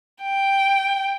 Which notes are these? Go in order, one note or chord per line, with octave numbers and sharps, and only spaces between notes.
G5